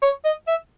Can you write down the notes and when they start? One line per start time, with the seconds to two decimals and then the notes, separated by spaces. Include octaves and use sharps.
0.02 C#5
0.25 D#5
0.48 E5